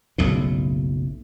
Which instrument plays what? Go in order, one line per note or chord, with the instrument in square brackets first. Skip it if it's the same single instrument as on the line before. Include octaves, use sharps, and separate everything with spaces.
[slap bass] F#1 B1 A2